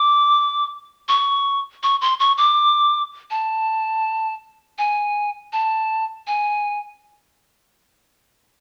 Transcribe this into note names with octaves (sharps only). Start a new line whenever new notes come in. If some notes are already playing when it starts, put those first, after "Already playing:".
Already playing: D6
C#6
C#6
C6
C#6
D6
A5
G#5
A5
G#5